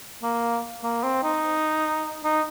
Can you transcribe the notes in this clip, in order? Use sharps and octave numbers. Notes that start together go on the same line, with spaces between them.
A#3
A#3
C4
D#4
D#4